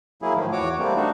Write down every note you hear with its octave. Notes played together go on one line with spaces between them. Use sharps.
F#3 A#3 E4 G#4
A2 D#3 F3
E2 F#4 C#5 D6
G3 A3 A#3 C4
A3 D4 D#4 F#4